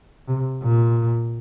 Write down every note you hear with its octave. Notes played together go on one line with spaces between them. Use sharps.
C3
A#2